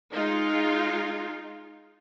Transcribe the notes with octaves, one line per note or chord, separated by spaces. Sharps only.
G#3 D#4 F4